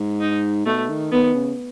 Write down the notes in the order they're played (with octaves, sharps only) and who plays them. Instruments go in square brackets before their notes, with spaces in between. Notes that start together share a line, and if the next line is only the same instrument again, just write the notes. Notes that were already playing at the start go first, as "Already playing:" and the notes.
Already playing: [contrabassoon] G#2
[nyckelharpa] D#4
[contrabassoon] B2 [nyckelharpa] A3
[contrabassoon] D#3
[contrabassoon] D#3 [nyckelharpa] B3
[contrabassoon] C#3